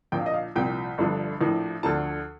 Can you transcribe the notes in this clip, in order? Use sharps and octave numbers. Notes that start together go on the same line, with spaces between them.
A#1 A#2 F3 G5
F5
D#5
F5
C2 A#2 F3 G5
G1 G2 D3 F3
A#1 A2 F3
D2 D3 F3 A5